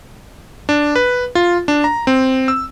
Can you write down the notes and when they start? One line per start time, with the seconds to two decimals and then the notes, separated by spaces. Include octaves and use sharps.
0.69 D4
0.96 B4
1.35 F4
1.68 D4
1.84 A#5
2.07 C4
2.48 E6